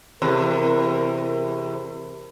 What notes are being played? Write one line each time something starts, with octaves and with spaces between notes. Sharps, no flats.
E2 C3 A#4